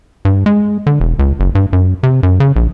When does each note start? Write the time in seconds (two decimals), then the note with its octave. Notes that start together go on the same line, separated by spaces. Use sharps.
0.25 G2
0.46 G#3
0.87 D3
1.00 E1
1.19 C#2
1.40 F#1
1.55 G2
1.73 F#2
2.03 C3
2.23 F#2
2.40 C#3
2.56 A#1